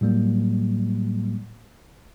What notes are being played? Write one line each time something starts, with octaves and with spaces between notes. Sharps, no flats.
A2 F#3 G3 A#3